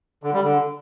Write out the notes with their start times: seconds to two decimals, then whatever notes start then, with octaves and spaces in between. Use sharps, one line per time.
0.23 D3
0.33 G3
0.43 D3